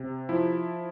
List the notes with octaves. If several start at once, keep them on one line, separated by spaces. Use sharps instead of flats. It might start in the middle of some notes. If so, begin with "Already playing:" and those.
Already playing: C3
F3 E4